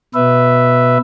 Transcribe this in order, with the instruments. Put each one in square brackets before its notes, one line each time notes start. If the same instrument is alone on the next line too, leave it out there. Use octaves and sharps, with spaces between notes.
[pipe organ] B2 B4 E5